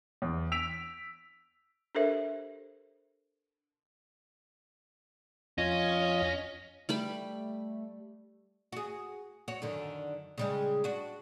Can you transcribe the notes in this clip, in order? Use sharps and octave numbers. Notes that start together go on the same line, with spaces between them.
E2
E6 B6 D7 F7
D4 G4 A4 A#4 C5 E5
F2 C#4 F4 D#5 D#6
G3 A3 G4 B5
F#4 G#4
F#4 C#5
F#2 D3 D#3
C#3 G3 G#3
D4 F#4